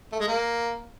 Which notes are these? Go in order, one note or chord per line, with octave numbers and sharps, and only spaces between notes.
A3
G#3
A#3